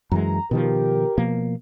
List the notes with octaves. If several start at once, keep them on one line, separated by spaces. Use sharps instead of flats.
F#2 E3 G#3 A#5
B2 D#3 F3 G4 A#4
B2 F3 A#3